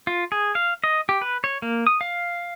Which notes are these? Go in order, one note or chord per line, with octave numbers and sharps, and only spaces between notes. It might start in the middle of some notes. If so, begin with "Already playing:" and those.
F4
G#4
F5
D#5
G4
B4
C#5
A#3
D#6
F5